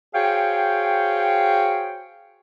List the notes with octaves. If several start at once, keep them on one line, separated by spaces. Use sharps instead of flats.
F#4 G#4 C5 C#5 F5 G5